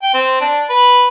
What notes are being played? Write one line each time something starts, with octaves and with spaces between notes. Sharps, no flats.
G5
C4
D4
B4